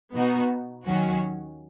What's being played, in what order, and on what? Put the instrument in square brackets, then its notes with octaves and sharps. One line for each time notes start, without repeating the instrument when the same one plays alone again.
[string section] B2 B3 D#4 F#4
D#2 D#3 F#3 C#4 F#4